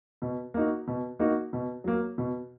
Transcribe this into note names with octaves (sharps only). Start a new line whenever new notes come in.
B2
A#3 D#4 F#4
B2
A#3 D#4 F#4
B2
F#3 A#3
B2